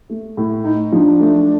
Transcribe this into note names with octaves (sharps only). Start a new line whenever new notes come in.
A3
A2
D#4
F3 D4
A3